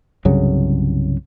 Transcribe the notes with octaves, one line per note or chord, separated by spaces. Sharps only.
C2 G2 C#3 F#3